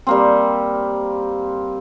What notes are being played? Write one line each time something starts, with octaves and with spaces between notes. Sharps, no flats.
G3 A#3 C4